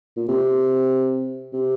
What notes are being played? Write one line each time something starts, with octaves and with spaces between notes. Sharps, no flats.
A#2
C3
C3